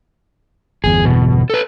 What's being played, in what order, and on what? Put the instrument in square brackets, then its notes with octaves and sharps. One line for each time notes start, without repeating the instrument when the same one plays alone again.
[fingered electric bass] G1 E2 [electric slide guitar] G#4
[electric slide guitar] B2
A4 B4